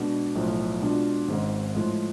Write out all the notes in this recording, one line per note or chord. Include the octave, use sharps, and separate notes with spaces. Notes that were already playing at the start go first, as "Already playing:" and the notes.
Already playing: B2 G#3 D4 F#4
B1 A2 F3
B2 G#3 D4 F4
G#1 G#2 G#3 C#4
A2 F3 G#3